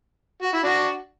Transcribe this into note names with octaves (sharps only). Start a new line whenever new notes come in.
F#4
E4
D4 F#4